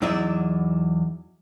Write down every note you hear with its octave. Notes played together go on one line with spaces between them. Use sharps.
E2 F#3 D#4 E4 D5 E5